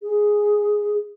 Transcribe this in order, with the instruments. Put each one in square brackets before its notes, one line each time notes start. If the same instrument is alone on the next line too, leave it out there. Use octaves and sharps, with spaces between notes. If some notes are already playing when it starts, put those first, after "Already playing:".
[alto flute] G#4